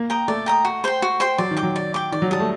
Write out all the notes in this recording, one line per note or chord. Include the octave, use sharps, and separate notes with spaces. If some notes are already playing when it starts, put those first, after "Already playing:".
Already playing: A#3
G5 A#5 D#6
A3 D5
G5 A#5 D#6
F#4
C5 G5 C6
F#4
C5 G5 C6
F#3 D5
D#3
G5 D6
F#3
D5
G5 D6
D#3 D5
F#3
G3 A5 D#6
A3